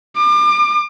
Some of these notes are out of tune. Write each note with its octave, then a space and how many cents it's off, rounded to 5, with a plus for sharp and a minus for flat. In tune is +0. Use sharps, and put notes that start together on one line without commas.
D6 +35